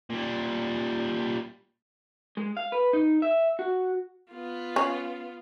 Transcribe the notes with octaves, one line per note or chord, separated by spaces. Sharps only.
A#2 G3
G#3
F5
B4
D#4
E5
F#4
B3 F4
C#4